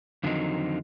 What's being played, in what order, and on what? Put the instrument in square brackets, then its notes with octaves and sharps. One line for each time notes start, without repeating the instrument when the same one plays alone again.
[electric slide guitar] F2 D3 D#3 F#3 C4 D#4